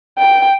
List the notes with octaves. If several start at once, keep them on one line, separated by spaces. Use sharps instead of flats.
G5